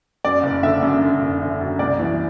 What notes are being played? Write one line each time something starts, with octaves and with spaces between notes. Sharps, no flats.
F#2 D5
F#1
D3 E5
F#2
D3
F#1
D3
F#2
C2 D5
E3